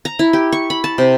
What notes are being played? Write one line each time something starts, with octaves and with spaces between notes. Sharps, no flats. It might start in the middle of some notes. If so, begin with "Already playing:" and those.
A#5
E4
G4
C#6
B5
A5
C3